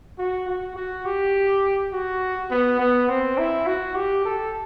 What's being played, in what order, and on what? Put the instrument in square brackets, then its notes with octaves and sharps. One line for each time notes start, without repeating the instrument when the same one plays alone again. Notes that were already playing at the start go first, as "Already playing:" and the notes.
[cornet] F#4
F#4
F#4
G4
F#4
B3
B3
C4
E4
F#4
G4
A4